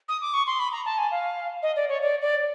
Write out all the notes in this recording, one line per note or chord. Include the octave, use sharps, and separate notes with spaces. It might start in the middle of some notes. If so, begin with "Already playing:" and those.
D#6
D6
C#6
C6
B5
A#5
A5
G#5
F5
D#5
D5
C#5
D5
D5